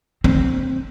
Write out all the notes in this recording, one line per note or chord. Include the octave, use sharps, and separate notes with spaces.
C4